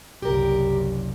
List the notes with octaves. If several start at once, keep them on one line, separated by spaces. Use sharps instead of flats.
F#1 C2 G4 A#4